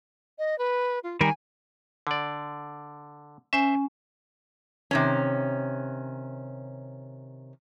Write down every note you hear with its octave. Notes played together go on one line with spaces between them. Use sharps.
D#5
B4
F4
D#3 G3 A#4 G#5
D3 D5
C#4 C5 E5 G#5
C3 D#3 C#4